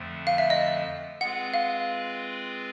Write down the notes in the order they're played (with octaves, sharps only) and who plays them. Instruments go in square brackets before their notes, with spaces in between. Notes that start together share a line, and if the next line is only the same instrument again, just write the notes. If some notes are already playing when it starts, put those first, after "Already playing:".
Already playing: [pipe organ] F2 D3 F3 A3
[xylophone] F5
E5
D#5
[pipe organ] G#3 C4 F4 G#4 B4 [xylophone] F#5
[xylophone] F5